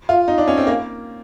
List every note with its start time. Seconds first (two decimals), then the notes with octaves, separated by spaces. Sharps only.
0.09 F4
0.28 D#4
0.38 D4
0.48 C#4
0.57 C4
0.67 A#3